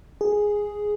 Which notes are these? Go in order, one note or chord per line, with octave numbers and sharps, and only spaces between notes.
G#4